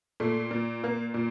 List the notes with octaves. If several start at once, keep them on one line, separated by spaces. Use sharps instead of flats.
A#2 A3
A#2
A#2 A#3
A#2